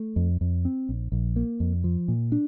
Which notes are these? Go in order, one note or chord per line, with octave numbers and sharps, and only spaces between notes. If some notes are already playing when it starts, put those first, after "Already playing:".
Already playing: A3
F2
F2
C4
A#1
A#1
A#3
F2
F3
A#2
D4